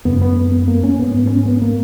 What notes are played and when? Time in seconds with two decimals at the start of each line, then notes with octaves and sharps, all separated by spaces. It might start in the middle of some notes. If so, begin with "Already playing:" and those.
0.05 F#2 C#3 B3
0.21 B3
0.36 B3
0.52 B3
0.68 A#3
0.83 C#4
0.99 G#2 B3
1.14 B3
1.26 B3
1.30 C#4
1.46 B3
1.62 A#3